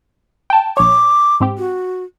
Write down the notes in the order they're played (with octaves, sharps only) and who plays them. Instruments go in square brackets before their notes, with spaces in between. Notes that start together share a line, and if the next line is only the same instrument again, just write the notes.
[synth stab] G5 A5
[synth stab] A#1 C#5 [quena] D6
[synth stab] G#2 C4 G4
[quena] F#4